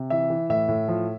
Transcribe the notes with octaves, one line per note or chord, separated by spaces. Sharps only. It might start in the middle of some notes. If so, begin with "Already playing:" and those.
Already playing: C3
E3 E5
E3
A2 E5
A2
F3